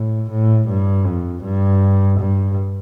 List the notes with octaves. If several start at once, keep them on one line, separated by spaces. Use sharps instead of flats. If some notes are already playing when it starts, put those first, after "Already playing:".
Already playing: A2
A2
G2
F2
G2
G2